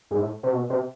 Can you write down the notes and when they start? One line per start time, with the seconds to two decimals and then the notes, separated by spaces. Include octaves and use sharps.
0.11 G#2
0.20 A2
0.43 C3
0.53 B2
0.70 C3